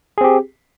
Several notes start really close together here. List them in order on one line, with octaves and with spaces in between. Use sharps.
G#4 C4 G4